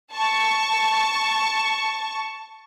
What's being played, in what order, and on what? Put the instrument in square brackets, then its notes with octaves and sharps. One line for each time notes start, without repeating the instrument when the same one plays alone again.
[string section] A5 C#6